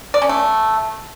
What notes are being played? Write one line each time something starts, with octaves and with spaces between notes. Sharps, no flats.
D5
C#4
A3